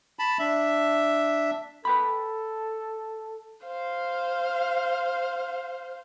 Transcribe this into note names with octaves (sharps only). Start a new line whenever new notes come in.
A5 B5
D4 E5
A4 B4 G5 B5
C5 F5